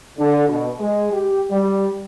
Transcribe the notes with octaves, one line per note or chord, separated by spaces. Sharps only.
D3
B2
G#3
G4
G3